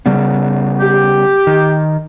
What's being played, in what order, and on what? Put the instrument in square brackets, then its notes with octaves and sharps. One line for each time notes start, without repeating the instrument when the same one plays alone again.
[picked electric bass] C#3 G3 B3
[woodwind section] G4
[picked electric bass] D#3